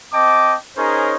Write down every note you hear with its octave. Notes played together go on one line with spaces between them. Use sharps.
C4 D#5 G5 A5 D6
C#4 D#4 G#4 A#4 C5 C#5